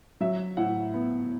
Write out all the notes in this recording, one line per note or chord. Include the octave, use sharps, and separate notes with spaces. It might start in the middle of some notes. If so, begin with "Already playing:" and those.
F#3 E5
A2 F#5
B3